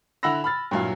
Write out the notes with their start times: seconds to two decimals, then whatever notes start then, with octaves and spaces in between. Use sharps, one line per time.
0.23 D3 E4 F#5 B5 E6 A#6
0.44 B5 F6 A6
0.71 G2 A#2 F#3 E4 F5